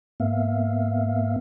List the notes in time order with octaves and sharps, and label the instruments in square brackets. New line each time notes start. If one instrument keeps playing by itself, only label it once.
[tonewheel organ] G#2 A#3 B3 E5 F5